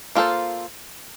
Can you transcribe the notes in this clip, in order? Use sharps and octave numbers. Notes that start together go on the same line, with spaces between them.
A#3 F4 A4 C5